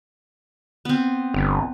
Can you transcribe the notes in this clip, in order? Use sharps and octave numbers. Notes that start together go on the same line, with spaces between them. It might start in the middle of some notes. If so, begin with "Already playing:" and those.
B3 C4
G1